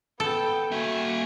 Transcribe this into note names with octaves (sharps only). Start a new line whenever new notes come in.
B3 A4 G5
A#3 F#4 E5 G#5